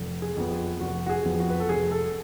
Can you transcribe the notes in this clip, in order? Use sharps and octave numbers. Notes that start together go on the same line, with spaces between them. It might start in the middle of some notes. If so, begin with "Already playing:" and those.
Already playing: F1
G#4
F2 F3 B3
G#4
F1 F#4
F#4
G#4
F2 F3 B3
F#4
B4
A4
F1 G#4
A4